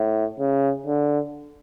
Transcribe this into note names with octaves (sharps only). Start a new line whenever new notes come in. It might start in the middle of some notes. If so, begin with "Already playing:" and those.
Already playing: A2
C#3
D3